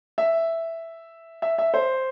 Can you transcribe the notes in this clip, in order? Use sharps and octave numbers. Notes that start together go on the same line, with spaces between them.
E5
E5
E5
C5